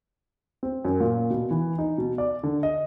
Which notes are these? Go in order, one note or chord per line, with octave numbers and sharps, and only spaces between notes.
C4
F#2
A#2
B2
E3
D#4
B2
D5
D3
D#5